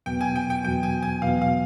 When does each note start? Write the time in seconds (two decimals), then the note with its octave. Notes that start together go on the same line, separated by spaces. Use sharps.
0.06 E2 B2 F#3 B3 G5
0.21 G#5
0.36 G5
0.50 G5
0.64 E2 B2 F#3 B3 G5
0.83 G#5
1.03 G#5
1.22 E2 B2 F#3 B3 F5
1.42 F5